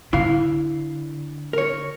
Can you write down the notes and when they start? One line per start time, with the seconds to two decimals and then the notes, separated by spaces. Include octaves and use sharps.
0.13 D3 E4 F5
1.53 A#4 C#5